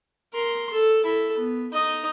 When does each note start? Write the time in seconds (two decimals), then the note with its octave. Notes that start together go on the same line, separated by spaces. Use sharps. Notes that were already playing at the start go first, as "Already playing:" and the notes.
0.34 A#4 C6
0.73 A4
1.05 E4 A4
1.37 B3
1.73 D#4 D#5